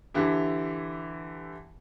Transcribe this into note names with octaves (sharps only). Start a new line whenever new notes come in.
D3 E3 E4 G4